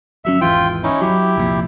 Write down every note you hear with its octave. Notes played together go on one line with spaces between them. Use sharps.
G1 F#3 C#4 E5
G#1 E2 E3 F4 G5
C#4 D#4 E4
F#3 E4 G4
C2 F2 A#2